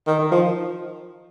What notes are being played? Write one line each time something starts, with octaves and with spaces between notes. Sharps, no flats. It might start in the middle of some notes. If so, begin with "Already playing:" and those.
D#3
D#3
F3